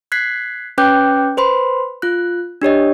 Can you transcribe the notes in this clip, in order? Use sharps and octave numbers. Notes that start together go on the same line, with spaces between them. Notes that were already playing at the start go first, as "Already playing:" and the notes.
F#6 G#6 B6 C7
C#4 B4 G5 D6 F#6 G6
B4 C5 B5 C6
F4 F#6
D4 G4 C#5 D#5